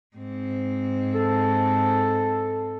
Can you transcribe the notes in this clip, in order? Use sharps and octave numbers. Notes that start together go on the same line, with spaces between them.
G#2 C4
A4